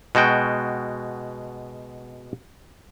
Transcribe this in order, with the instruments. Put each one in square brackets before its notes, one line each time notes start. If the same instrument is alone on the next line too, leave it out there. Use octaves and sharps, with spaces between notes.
[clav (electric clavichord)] B2 G#3 F#4 G5